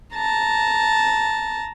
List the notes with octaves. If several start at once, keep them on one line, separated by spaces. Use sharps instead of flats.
A5 A#5